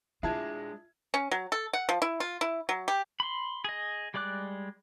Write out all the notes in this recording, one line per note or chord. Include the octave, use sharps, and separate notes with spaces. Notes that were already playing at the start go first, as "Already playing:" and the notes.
G#3 D4 E4 F4 A5 G#6
C#4
F#3
A4
F#5
F3
E4
F4
E4
F#3
G4
B5 C6
G#4 D#5
G3 G#3 D5 D6 F#6